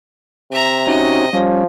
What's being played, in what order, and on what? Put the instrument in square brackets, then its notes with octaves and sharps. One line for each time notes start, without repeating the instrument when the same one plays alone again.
[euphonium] C3 [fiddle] E5 A#5
[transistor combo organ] C#4 D#4 F#4 [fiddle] D#5
[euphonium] F3 [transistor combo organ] G3 C#4